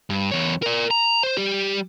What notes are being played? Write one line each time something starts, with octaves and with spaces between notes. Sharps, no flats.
G2
E2 C#5
A#4 D5
A#5
C5
G3 G4